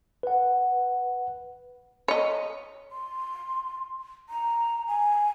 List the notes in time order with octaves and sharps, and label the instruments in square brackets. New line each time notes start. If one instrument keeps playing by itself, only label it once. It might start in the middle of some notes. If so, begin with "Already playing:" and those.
[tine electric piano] B4 F#5
[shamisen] C#5 D#5
[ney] C6
A#5
G#5